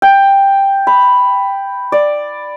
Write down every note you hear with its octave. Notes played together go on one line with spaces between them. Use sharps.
G5
B5
D5